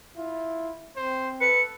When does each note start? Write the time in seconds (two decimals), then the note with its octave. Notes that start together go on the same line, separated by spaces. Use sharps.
0.17 E4 F4
0.96 C4 C5
1.41 A4 B4 C#7